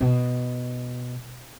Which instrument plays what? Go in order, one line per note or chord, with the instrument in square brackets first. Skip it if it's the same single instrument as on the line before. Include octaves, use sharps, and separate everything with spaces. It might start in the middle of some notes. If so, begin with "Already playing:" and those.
[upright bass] B2